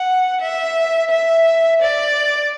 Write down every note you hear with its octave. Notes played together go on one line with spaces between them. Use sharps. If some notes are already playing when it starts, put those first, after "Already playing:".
Already playing: F#5
E5
E5
D5